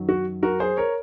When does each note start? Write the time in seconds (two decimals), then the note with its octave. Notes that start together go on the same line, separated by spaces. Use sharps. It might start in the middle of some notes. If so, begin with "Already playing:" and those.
Already playing: F#2 D#3 F#3
0.09 F#4
0.43 F#4 A#4
0.60 G#4 C5
0.77 A#4 C#5